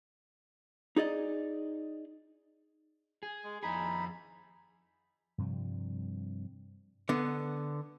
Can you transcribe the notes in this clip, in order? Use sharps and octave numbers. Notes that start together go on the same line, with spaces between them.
D#4 G#4 D5 D#5
G#4
G#3
F2 D#4 G#4 B5
G2 C3 F3 G3
D3 B3